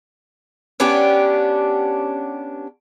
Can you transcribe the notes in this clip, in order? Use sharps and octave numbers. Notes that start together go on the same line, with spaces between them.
B3 C#4 D4 G4